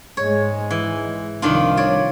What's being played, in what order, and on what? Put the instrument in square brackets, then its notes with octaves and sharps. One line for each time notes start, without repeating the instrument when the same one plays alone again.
[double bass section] G#2 G#3 [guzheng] C#5
[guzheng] E3
[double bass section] C2 F3 [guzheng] D#3 D4 F4
[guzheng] C#5 D5